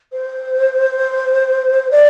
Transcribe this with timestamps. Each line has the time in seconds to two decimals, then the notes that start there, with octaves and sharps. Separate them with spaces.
0.13 C5
1.91 D5